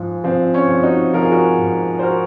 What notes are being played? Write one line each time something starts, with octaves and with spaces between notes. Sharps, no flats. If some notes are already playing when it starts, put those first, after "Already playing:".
Already playing: G#2 F3
F3 C4
C#4
F3
D#4 F#4
F3 A#4
G#4
F#4 A#4
G#2
C5
F#4 A#4